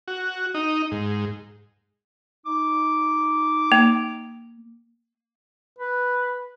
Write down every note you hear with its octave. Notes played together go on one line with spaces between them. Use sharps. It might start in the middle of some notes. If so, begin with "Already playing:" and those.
F#4
D#4
G#2
D#4 D6
A#3
B4